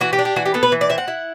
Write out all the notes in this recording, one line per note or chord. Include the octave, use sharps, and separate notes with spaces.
E3 F#4
G4
D4
G4
E3 F#4
G4
B3 A4
B4
E3
D5
C4 E5
F#5
E4